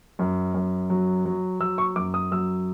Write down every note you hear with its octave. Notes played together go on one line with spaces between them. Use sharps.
F#2
F#2
F#3
F#3
F#3 E6
C#6
F#2 D6
D#6
F#3 E6